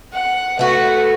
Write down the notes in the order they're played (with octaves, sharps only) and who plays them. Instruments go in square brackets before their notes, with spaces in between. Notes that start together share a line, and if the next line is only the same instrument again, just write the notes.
[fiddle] F#5
[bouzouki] A3 F#4 [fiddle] B4